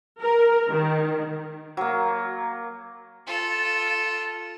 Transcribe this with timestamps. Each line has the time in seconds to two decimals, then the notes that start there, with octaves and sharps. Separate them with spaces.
0.19 A#4
0.68 D#3
1.77 F#3 A#3
3.27 F4 A4